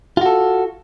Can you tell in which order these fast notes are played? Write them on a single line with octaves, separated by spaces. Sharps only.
F4 F#4 A4